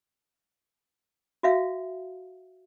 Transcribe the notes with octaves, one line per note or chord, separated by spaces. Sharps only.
F#4 E5 F5